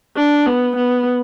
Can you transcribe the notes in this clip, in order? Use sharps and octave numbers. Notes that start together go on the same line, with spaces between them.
D4
B3
B3